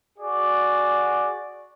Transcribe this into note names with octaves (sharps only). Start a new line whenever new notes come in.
F#4 G#4 D5